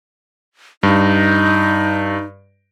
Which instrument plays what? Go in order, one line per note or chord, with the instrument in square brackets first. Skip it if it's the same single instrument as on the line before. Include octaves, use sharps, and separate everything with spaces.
[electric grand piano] G2 [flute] D#4